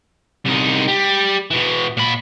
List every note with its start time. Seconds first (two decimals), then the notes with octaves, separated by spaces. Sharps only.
0.45 C2 D#4
0.88 G3
1.51 B2 E3
1.97 A#2 B5